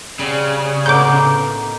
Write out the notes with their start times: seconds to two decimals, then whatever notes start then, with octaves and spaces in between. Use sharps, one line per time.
0.19 C#3 G3 C4
0.86 A2 B3 D#4 A#4 D6 G6